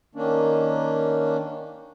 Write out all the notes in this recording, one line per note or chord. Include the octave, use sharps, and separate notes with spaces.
D#3 A#3 C#4 D4